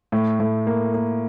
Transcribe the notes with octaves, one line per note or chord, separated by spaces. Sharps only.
A2
A2
A#3
A#3